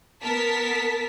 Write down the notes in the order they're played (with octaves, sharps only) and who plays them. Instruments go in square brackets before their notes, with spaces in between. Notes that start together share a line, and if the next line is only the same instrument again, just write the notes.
[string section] B3 A#4 A5 B6